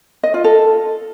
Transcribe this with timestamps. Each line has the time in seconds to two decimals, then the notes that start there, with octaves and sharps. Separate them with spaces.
0.23 D#5
0.34 F4
0.44 A4